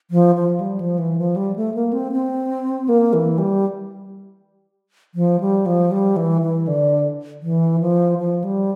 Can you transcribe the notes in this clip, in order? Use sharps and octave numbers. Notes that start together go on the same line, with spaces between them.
F3
F3
G3
F3
E3
F3
G3
A3
A#3
C4
C4
A#3
E3
G3
F3
G3
F3
G3
E3
E3
D3
E3
F3
F3
G3